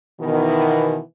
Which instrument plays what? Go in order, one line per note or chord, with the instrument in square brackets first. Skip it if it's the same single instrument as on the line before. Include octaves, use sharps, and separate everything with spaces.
[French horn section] B2 D#3 E3